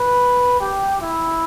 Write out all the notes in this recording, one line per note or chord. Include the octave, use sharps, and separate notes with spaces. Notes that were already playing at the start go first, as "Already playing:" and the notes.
Already playing: B4
G4
E4